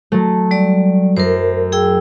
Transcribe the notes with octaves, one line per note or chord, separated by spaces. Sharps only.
F#3 A3
G3 D5
F#2 A#4 C5
G#4 G5 E6